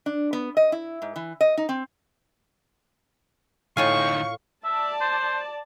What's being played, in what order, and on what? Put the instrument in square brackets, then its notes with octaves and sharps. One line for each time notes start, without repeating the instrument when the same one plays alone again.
[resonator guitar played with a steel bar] D4
B3
D#5
E4
G#2
E3
D#5
D#4
C4
[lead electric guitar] D2 D#4 [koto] A2 F4 G#5 [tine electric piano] F5 [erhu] C#6
[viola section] D5 A5 [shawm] E5
[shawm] C5